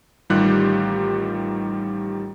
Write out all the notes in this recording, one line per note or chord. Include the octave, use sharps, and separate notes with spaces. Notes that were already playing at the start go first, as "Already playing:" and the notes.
A1 D#3 G3 F4 G4 F#6